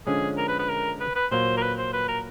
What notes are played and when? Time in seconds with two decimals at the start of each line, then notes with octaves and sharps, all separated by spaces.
0.07 D3 F3 G#3 C#4 G#4
0.37 A#4
0.48 B4
0.59 B4
0.69 A#4
1.00 B4
1.15 B4
1.31 A#2 F#3 A#3 C5
1.57 A#4
1.62 B4
1.78 C5
1.93 B4
2.08 A#4